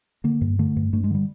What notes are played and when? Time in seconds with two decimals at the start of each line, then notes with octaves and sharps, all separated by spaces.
0.24 D3 A#3
0.41 G2
0.59 D3 A3
0.76 G2
0.93 G2 A3
1.04 G#3
1.10 D3 G3